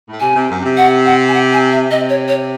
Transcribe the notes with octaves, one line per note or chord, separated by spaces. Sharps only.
A2
C3 G#5
C3
F#2
C3
F#5
F#5
G#5
F#5
G#5
E5
C3 D#5
C#5
C#5